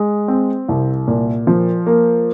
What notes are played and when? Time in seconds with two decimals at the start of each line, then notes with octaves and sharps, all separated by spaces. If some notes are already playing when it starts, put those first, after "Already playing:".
Already playing: G#3
0.28 C4
0.69 C2
1.08 A#2
1.47 F3
1.86 A#3